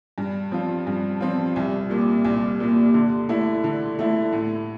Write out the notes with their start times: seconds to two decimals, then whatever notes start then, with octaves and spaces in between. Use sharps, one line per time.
0.18 G2
0.52 F3 C4 F4
0.87 G2
1.21 F3 C4 F4
1.56 C2
1.90 A#2 G3 A#3
2.25 C2
2.60 A#2 G3 A#3
2.94 D3
3.29 A3 E4
3.64 D3
3.99 A3 E4
4.33 A2